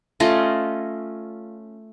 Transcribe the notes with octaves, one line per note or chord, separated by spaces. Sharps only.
A3 C#4 F4 D#5